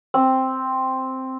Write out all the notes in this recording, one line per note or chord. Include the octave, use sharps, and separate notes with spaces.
C4